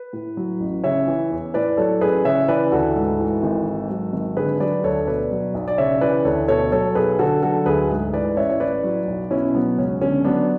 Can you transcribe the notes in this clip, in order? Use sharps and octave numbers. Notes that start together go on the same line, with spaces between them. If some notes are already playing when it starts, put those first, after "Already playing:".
Already playing: B4
A2
F#3
A1
C#3 C#5 E5
E3
E2
A2 B4 D5
F#3 A4 C#5
A1 G#4 B4
C#3 C#5 E5
E3 B4 D5
D2 F#4 A4
G#2
E3
G#1
G#2
F#3
G#1
D3 G#4 B4
F#3 B4 D5
D2 A4 C#5
B2 B4 D5
F#3
B1
D5
C#3 C#5 E5
E3 B4 D5
D2 A4 C#5
B2 A4 C#5
F#3 A4 C#5
B1 G#4 B4
D3 F#4 A4
F#3 F#4 A4
D2 G#4 B4
G#2
E3 B4 D5
A1 C#5 E5
C#5
A2 B4 D5
F#3
B1
B2 C#4 E4
F#3 B3
C#2 C#4
D3 C#4
F#3 B3 D4